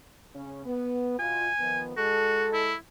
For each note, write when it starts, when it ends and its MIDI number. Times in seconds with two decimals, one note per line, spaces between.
0.35 0.66 49
0.35 0.66 61
0.66 1.16 59
1.19 1.49 47
1.19 1.49 65
1.19 1.81 80
1.59 1.93 51
1.59 1.93 53
1.59 1.93 59
1.97 2.74 56
1.97 2.47 66
1.97 2.74 69
2.53 2.75 64